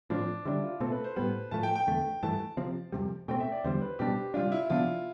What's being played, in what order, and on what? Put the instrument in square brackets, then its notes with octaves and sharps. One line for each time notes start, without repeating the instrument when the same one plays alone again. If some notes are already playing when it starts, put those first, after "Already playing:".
[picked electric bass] A2 F3 C4 [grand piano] D4
[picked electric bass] D3 G3 B3 D4 [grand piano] E4
[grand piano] F4
[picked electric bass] B2 A3 C4 [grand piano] A4
[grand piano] B4
C5
[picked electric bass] A2 G3 B3 [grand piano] B4
[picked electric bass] A2 F3 A3 [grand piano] A5
[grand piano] G5
G5
[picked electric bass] E2 D3 A3
[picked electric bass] G2 E3 A3 [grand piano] A5
[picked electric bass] C3 F3 C4
F2 C3 G3
[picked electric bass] B2 A3 C4 [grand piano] G5
[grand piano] E5
D5
[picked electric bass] E2 D3 G3 [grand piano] C5
[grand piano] B4
[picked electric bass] B2 G3 D4 [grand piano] G4
[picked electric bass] C3 G3 D4 [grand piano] F4
[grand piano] E4
[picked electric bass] C3 F3 B3 D4 [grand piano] F4